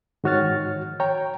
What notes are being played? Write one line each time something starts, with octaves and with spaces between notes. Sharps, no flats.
G#2 D#3 F#4 C#5 F6 A6
C#5 G5 A#5